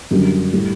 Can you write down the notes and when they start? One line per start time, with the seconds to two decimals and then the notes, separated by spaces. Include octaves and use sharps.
0.11 F#2 D3 G3
0.52 A2 G3